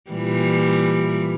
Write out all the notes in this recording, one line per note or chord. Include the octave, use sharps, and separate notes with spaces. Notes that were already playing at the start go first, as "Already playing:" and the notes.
A#2 E3 G3